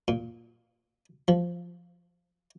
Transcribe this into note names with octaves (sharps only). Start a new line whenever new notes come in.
A#2
F3